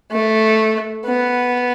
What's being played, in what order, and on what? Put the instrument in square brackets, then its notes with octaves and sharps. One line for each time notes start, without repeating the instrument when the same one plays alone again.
[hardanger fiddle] A3
B3